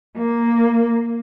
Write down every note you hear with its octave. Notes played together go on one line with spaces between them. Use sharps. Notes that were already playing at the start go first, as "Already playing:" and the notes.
A#3